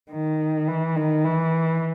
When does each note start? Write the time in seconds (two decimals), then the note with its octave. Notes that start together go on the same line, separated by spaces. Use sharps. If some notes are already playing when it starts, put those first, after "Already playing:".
0.11 D#3
0.68 E3
0.96 D#3
1.24 E3